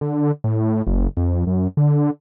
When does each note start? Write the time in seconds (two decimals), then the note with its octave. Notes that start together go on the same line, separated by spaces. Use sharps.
0.01 D3
0.44 A2
0.87 F#1
1.17 F2
1.47 F#2
1.77 D3